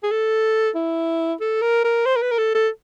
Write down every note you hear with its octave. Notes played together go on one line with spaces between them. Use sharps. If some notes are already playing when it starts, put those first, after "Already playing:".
G#4
A4
E4
A4
A#4
A#4
C5
A#4
B4
A#4
A4
A4